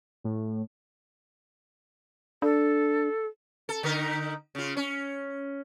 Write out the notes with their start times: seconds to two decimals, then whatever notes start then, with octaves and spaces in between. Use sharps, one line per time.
0.24 A2
2.42 D4 A4
3.69 A4
3.83 D3 D#4 A#4
4.55 C#3 F4
4.77 C#4